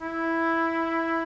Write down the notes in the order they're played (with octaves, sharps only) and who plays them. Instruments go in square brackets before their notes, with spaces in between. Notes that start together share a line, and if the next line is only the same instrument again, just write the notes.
[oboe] E4